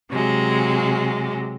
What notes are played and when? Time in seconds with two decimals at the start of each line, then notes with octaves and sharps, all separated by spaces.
0.11 C3 F#3 G#3